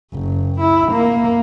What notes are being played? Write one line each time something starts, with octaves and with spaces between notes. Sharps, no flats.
F#1
E4
A#3